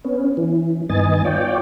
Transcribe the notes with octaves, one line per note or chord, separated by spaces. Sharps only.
B3 C#4
E3
G2 D#3 B3 D#5 G#5 A6
F4 C#5 D5 G5